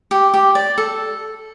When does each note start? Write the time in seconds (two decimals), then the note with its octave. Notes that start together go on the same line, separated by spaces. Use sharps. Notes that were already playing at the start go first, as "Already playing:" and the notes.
0.11 G4
0.34 G4
0.55 D5
0.78 A4